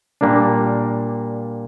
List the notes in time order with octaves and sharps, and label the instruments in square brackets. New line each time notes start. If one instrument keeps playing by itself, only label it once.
[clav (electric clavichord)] A#2 G3 A#3 D4